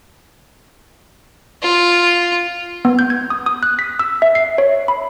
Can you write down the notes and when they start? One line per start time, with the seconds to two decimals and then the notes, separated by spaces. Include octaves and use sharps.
1.62 F4
2.85 B3
2.99 G6
3.10 G#6
3.30 D#6
3.46 D#6
3.63 F#6
3.79 B6
3.99 E6
4.22 E5
4.35 C7
4.58 C#5
4.88 B5